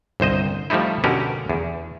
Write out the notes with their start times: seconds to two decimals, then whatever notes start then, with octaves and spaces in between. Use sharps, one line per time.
0.20 G1 C2 C5 D#5
0.70 F3 G3 A3 D#4 E4
1.04 B2 D3 C#4 G4 A#4
1.50 E2